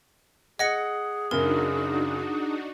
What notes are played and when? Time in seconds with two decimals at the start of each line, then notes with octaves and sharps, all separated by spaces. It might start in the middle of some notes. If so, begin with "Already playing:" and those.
0.59 G#4 D#5 F#5 G#6 A#6 C#7
1.31 F#2 C#3 D4 D#4 F#4 A#4